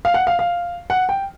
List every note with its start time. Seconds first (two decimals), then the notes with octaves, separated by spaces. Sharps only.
0.05 F5
0.14 F#5
0.27 F5
0.39 F5
0.90 F#5
1.09 G5